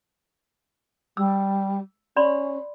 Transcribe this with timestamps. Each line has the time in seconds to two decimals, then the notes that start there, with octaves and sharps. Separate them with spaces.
1.17 G3 E6
2.16 C#4 D5 B5 C6